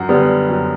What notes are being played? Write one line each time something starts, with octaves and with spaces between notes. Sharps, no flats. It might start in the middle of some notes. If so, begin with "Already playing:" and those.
Already playing: F#2 F#5
D3 G3 B3
F#2